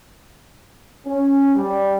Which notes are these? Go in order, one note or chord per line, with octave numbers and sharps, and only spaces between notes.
C#4
G3